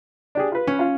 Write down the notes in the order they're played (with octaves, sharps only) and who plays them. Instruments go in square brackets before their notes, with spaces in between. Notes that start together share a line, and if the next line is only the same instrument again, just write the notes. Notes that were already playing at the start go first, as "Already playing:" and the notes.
[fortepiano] D4 G4 G#4
F4 B4
[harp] C#4
[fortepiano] F4 F5